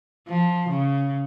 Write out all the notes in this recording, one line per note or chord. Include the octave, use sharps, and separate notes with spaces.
F3
C#3